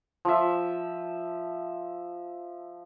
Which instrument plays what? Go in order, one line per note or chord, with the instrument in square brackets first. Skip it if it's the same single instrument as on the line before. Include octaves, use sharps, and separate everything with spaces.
[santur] F3 E5